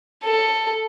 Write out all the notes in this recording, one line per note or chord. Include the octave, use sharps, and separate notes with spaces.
A4